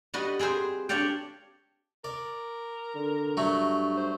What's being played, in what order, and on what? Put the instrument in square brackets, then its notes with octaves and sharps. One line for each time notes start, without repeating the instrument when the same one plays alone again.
[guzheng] G3 F#4 B4 D#5
C4 G#4 B4 C5
D4 G4 C#5 D5 F5 G5
[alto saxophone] A#4 [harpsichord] D5
[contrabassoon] D3
[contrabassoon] G2 [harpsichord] F#3 A3
[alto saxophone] C5